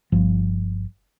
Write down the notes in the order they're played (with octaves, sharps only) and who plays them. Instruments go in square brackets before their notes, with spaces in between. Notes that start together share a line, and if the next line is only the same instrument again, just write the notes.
[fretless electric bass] G1 F3